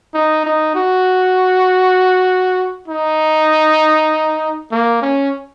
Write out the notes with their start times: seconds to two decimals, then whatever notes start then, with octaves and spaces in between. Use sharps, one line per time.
0.14 D#4
0.45 D#4
0.75 F#4
2.88 D#4
4.72 A#3
5.02 C#4